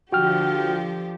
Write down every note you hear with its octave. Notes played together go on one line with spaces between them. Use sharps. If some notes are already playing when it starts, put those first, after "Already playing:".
D3 F3 F#4 G4 G5 F6